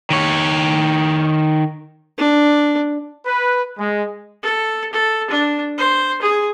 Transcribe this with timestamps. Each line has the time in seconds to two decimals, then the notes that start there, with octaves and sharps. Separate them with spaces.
0.10 D#3 C#5
2.18 D4
3.26 B4
3.78 G#3
4.42 A4
4.93 A4
5.30 D4
5.78 C5
6.21 G#4